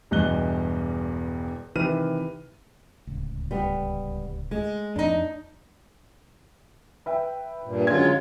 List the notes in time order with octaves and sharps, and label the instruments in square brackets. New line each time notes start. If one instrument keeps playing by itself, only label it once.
[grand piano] E1 E2 G2 D#5 F#6 G7
C3 D#3 E3 B4 F6 D#7
[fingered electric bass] D1 C#2
[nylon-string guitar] G3 B3
G#3
[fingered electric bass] F2 [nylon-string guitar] D4 D#4
[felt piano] B4 E5 G5
[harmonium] G2 A#2
[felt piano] D3 C#4 G#6 [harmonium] F#3 G#3 F4